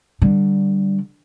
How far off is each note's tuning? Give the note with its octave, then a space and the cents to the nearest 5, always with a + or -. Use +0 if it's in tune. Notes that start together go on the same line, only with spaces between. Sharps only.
D3 +0 G3 -10